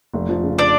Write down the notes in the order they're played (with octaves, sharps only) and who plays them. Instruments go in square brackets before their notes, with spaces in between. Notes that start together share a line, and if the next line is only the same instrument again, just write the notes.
[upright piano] F1
F3
C#3
[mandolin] D4 D5